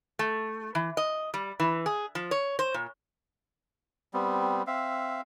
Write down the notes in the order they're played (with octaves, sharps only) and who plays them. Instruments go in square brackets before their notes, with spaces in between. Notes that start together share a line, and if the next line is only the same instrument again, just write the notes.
[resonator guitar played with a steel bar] A3
E3
D#5
G3
E3
G#4
F3
C#5
C5
A#2
[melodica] G3 B3 C4
C4 E5 F5